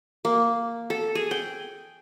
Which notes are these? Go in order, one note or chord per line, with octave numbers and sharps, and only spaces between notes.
A#3
A4
G#4
G5